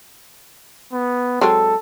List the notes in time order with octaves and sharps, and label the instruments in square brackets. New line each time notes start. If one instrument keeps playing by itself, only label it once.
[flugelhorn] B3
[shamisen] F#3 G#3 C4 [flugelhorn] A4